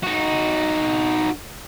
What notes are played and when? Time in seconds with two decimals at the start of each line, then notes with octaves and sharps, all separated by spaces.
0.03 D#4 F#4